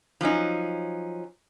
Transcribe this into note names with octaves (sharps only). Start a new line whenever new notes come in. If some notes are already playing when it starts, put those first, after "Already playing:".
F3 F#3 C#4 D#4